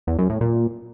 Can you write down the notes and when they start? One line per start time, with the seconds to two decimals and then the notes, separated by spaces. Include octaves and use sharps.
0.07 E2
0.18 F#2
0.30 A2
0.41 A#2